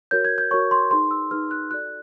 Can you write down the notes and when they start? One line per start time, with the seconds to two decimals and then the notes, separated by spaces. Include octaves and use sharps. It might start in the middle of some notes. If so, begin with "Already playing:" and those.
0.11 F#4 A#4 C#5 G6
0.25 G#6
0.38 G6
0.51 F#4 A#4 C#5 C#6
0.71 C6
0.91 D#4 G#4 B4 C6
1.11 E6
1.31 D#4 G#4 B4 F6
1.51 F#6
1.71 F#4 A4 D5 F#6